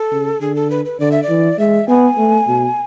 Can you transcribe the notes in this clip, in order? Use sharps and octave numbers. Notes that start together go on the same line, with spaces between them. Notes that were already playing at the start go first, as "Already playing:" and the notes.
Already playing: A4
C#3
D3 G#4
A4
B4
B4
D3 D5
E5
D5
E3
G#3 E5
B3 G#5
A3
B2